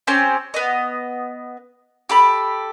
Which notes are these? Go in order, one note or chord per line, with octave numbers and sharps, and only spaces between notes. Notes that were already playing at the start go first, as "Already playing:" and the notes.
C4 C#4 G4 C5
B3 D#5
G4 A4 B5